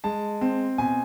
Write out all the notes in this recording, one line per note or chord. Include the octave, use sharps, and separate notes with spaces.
G#3 A5
C4
B2 G#5